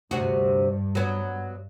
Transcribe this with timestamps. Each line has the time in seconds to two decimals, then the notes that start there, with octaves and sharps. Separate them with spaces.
0.11 D2 G2 C3 F#4
0.95 F#3 B3